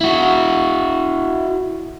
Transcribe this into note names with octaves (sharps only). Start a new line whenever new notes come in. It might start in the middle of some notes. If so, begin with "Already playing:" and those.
E4 F#4